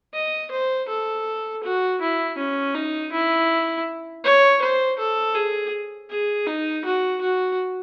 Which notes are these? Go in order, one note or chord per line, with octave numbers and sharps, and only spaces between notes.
D#5
C5
A4
F#4
E4
C#4
D#4
E4
C#5
C5
A4
G#4
G#4
D#4
F#4
F#4